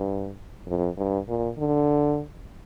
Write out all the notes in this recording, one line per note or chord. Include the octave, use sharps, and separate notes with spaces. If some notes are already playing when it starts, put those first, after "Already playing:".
Already playing: G2
F2
G2
A#2
D3